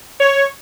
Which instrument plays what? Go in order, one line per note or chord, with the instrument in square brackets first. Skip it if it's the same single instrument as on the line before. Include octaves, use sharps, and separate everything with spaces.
[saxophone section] C#5